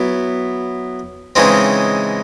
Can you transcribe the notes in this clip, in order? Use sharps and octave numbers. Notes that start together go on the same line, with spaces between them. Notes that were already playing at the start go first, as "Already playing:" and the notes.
Already playing: F#3 B3 E4
C#3 E3 G#3 C4 D#4